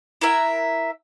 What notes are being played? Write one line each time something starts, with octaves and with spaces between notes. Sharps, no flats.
E4 A#4 E5 F#5